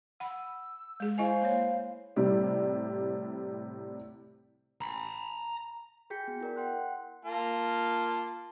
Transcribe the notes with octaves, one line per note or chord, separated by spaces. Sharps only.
F#5 B5 E6
G#3 G#4
E4 B4 C5 D#5 F5 G#5
A#3 C#5
A2 C3 G3
A#5 B5
F#4 G#4 G5 G6 B6 C#7
B3 G6
E4 A#4 D5
F#5 G5 C6 F#6
A#3 F4 A5